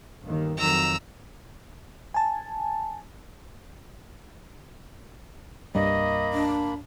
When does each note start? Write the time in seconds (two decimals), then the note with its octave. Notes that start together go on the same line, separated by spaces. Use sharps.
0.23 G1 D#2 D#3
0.57 F2 D#3 F#3 A#5 E6
2.14 G#5 A5
5.75 C2 G2 G3 A#3 D#5 B5
6.33 D4